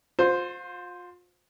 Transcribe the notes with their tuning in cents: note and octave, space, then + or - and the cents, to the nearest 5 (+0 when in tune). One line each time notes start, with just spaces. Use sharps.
F4 +35 C5 +0